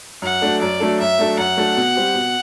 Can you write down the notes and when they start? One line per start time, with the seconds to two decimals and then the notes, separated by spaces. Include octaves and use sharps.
0.22 F#2 F#5
0.42 F#3 A3 D4 A4
0.61 F#2 D5
0.80 F#3 A3 D4 A4
0.99 F#2 E5
1.18 F#3 A3 D4 A4
1.38 F#2 F#5
1.57 F#3 A3 D4 A4
1.76 B2
1.95 G3 C4 G4
2.14 B2